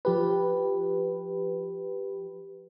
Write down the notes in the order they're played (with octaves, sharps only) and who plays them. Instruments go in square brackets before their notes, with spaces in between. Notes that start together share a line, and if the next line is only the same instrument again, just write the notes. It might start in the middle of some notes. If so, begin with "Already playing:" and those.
[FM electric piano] F3 G4 B4